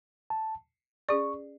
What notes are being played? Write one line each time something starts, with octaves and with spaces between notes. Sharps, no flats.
A5
C#4 G#4 D5 C#6